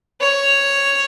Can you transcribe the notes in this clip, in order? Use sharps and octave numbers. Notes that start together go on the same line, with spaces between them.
C#5